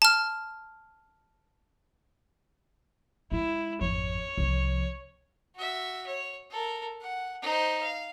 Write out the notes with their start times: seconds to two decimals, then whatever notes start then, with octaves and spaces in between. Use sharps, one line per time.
0.02 A5 F6
3.32 G#3 E4
3.81 G#1 F2 C#5
4.38 C2 F3
5.55 F#4 E5
6.07 C#5
6.51 A4 A#4
7.01 F#5
7.42 D#4 C5
7.81 F5